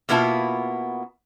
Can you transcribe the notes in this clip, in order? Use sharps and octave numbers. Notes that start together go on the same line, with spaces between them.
B2 A#3 B3 E4 F4 A5